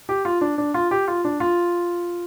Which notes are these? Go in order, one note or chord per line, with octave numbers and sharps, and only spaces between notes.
G4
F4
D4
D4
F4
G4
F4
D4
F4